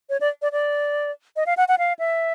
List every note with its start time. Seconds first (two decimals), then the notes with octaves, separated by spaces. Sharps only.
0.10 C#5
0.21 D5
0.42 D5
0.52 D5
1.36 D#5
1.46 F5
1.57 F#5
1.68 F#5
1.78 F5
1.99 E5